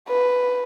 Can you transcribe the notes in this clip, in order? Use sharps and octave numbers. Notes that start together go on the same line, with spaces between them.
B4